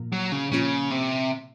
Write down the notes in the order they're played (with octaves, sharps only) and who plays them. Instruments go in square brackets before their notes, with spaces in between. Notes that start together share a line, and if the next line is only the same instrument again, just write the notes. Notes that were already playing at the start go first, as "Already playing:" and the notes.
Already playing: [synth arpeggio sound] A#2 F3 A#3 F4
[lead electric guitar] F#3
C#3
[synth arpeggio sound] A#2 F3 A#3 C#4 F4 [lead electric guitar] C#3
[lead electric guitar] C3